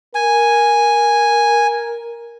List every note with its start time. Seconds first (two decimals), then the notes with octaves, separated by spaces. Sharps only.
0.15 A#4 G#5